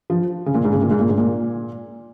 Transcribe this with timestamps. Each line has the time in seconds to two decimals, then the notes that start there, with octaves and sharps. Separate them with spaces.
0.10 F3
0.46 C#3
0.54 A#2
0.64 G#2
0.72 C#3
0.82 A#2
0.90 G#2
1.00 A#2
1.09 G#2
1.18 A#2